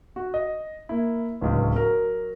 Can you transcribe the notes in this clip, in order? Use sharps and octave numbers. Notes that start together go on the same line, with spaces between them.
F#4
D#5
A#3 E4
D1 C#2
F#3 A#4